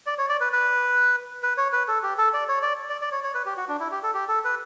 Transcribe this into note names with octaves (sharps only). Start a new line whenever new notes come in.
D5
C#5
D5
B4
B4
B4
C#5
B4
A4
G4
A4
D5
C#5
D5
D5
D5
C#5
C#5
B4
G4
F#4
D4
E4
G4
A4
G4
A4
B4